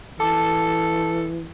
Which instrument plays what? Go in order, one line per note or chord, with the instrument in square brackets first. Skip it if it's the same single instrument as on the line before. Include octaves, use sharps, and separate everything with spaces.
[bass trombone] E3 [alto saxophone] A4 [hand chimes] A5 D6